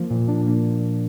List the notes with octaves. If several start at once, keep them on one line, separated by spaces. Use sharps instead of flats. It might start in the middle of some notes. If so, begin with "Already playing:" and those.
Already playing: F3 A#3
A#2
D4
A#3